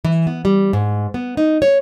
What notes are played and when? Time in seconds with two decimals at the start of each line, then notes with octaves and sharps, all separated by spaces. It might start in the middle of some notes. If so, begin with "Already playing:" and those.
0.05 E3
0.27 B3
0.45 G3
0.73 G#2
1.14 B3
1.37 D#4
1.62 C#5